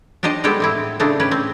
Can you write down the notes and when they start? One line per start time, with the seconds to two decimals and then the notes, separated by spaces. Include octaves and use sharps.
0.23 D4 D#4 G4 C5 D#5
0.44 G3 G#3 B3 G4 A4 G5
0.60 A2 C4 E4
1.00 A2 C#3 A3 D4 D#4 C5
1.20 C#4 G4 B4
1.31 C4